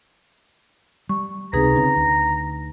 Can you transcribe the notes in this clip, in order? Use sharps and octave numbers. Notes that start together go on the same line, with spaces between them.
G3 C#6
C#2 C3 C4 D#4 G#4 B4 A#5
C#3 C4 C#4
D2